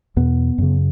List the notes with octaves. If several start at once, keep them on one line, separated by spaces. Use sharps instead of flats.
E2 B2 B3
F#2 C#3